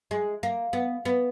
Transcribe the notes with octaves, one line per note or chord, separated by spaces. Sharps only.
G#3
A#3
B3
B3